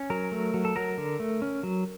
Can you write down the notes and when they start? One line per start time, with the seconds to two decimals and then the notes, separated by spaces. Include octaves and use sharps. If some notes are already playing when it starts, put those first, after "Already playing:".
Already playing: C#4
0.10 F#3 A#4
0.32 A3
0.54 F#3
0.65 A4
0.76 F#3 A#4
0.98 D3
1.20 A3
1.42 C#4
1.63 F#3